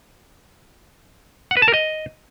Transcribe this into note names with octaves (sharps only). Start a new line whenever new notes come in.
F#5
B4
A5
A#4
D#5